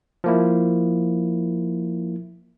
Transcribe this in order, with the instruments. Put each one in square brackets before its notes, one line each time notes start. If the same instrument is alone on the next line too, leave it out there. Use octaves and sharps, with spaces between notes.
[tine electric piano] F3 A#3 E4